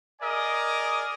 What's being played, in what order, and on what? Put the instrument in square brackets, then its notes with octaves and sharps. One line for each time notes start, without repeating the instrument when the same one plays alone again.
[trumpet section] G#4 A#4 D5 D#5 G#5 D#6